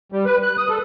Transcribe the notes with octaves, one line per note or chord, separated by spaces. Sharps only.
G3
B4
F#6
D#6
A4